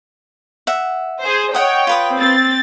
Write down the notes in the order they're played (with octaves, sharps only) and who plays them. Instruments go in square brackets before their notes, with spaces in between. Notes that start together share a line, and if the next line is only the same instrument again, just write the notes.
[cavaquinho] E5 F#5
[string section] G#4 C5
[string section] C#5 G5 [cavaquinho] D#5 F#5
[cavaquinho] F4 B4 D#6
[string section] C4 A6